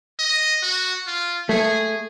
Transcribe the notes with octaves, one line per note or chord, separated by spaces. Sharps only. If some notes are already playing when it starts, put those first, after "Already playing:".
D#5
F#4
F4
A3 G#4